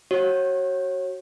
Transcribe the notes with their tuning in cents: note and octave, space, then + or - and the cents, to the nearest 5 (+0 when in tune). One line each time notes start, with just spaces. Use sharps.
F#4 +25 C#5 -30